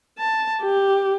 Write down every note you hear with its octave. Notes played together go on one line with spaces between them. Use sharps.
A5
G4